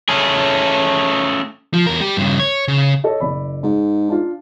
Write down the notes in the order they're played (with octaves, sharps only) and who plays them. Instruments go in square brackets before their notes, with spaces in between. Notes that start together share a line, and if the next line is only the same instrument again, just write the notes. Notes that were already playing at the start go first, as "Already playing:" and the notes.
[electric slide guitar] A3 C#4 G#4
[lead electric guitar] F3
E2 A#4
G3 G4
G2 C#3
C#5
C#3
[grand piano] A4 C#5 D#5
F#1 D5 B5
[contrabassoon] G#2 [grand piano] G#3
[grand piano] D4 F4